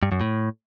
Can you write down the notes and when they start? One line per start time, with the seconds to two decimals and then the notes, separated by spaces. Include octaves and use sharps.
0.03 G2
0.12 F#2
0.21 A2